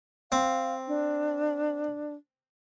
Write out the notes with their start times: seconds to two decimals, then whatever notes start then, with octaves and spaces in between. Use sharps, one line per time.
0.32 C4 F5
0.88 D4